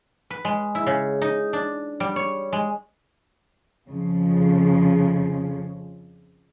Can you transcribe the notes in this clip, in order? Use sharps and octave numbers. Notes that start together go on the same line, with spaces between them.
B4
G#3
E4
C#3
D#4
D4
G3
C#5
G#3
F2 C#3 F3